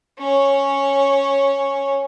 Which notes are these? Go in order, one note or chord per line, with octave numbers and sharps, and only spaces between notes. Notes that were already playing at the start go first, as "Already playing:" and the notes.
C#4 C#5